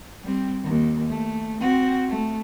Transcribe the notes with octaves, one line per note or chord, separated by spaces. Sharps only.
G3 C4
D#2
A3
C4 F#4
A3